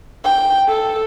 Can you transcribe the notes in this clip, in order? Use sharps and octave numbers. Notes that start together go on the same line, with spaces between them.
G5
A4